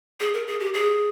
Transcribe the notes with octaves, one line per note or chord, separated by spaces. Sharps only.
G#4
A#4
G#4
G4
G#4